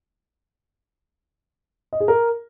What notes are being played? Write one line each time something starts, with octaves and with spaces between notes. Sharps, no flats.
D#5
G#4
A#4